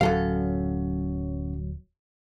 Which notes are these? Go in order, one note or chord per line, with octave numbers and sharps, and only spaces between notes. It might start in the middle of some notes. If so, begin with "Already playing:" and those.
D1 F#2 F#3 A4 F5